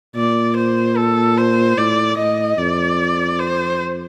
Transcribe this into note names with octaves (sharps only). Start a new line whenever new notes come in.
A#2 D5
C5
A4
C5
A2 D5
A2 D#5
F2 D5
C5